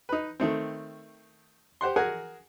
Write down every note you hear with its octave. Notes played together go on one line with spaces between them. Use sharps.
D#4 B4
D#3 A3 C4
G4 C5 F#5 C6
F#4 G#4 A#4 F#5 G#5